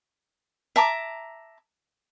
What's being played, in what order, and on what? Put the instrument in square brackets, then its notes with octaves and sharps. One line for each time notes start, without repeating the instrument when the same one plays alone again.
[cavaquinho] E5 A5 A#5 D6